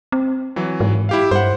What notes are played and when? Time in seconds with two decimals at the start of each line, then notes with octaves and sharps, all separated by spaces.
0.12 C4
0.56 E3 F#3
0.80 G#2
1.09 E4 G4 F5
1.31 G2 C5 F#5